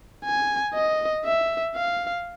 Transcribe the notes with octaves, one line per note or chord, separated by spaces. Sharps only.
G#5
D#5
E5
F5